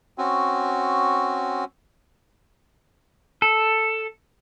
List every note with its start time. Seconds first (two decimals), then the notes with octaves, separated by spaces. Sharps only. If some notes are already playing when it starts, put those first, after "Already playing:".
0.18 C4 C#4 F#4
3.42 A4